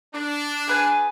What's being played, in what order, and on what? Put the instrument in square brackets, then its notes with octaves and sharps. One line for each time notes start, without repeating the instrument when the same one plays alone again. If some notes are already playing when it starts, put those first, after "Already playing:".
[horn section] D4
[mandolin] G#4 B4 G#5